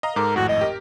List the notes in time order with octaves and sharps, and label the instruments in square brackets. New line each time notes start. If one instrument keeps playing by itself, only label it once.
[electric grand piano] D#5 F5 A#5
[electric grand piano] G#2 A4 D6 [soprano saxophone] A#4
[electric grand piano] G#1 F2 A2 [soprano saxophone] F#4
[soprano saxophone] D#5
[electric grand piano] G4 A#4